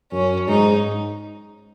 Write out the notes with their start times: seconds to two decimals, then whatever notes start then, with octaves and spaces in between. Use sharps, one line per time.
0.12 F#2 C#4
0.48 G#2 D#4